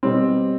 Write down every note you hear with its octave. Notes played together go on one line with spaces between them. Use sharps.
B2 G3 C4